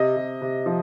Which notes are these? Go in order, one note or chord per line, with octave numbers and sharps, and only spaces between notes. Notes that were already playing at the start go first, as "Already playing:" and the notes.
Already playing: C3 D#5
C3
C3
F3